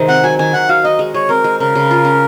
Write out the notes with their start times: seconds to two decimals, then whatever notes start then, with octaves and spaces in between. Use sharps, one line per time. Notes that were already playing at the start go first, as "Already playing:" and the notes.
Already playing: C3 D#3 G#3 D#4 G#4
0.08 C4 F#5
0.24 F#3 G#5
0.39 D#3 G#5
0.53 D#3 F#5
0.69 F#4 F5
0.84 D#4 D#5
0.99 G#3
1.14 G#3 C#5
1.29 C4 A#4
1.44 G#3
1.60 C#3 A#4
1.75 C#3
1.91 F4
2.05 C#4